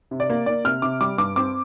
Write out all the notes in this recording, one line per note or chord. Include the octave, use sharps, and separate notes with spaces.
C3
D5
A#3
A#3 D5
C3 F6
C3 D6
G3 D6
G2 D6
C4 D6